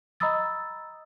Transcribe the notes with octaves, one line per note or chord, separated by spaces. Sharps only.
D#5 A#5 B5 D#6 E6 A6